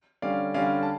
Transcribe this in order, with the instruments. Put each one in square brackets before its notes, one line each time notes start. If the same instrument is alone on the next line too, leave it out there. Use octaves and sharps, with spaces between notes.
[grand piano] D3 G3 C#4 D5 F5
D3 G3 C#4 D5 F5
A5